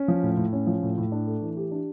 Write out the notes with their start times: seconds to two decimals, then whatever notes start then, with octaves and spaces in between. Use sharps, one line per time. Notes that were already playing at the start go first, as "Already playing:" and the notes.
Already playing: C#4
0.08 F3
0.23 A2
0.37 A2
0.53 C#4
0.67 F3
0.83 A2
0.98 A2
1.12 D4
1.27 A3
1.42 E3
1.57 G4
1.71 D4